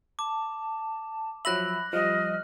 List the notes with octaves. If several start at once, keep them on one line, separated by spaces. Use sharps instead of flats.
A5 D6
F3 F#3 E5 B5 F#6 A#6 F#7
F3 G3 D#5 F6